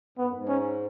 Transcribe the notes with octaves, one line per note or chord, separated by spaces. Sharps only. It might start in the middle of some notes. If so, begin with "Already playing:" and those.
G#2 B3
F#2
G#2
C#4